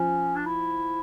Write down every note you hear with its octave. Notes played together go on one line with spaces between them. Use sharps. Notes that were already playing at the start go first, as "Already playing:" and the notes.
Already playing: F3 C#4
D4
E4